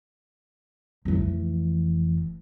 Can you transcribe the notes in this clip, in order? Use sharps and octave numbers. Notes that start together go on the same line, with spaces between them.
F1 E3